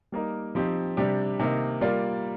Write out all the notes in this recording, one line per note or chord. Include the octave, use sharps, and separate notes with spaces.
G3 A#3 D#4 A#4
F3 C4 D#4 G4
C3 G3 D4 G4
C3 D#3 A#3 D#4
G3 A#3 F4 A#4 D5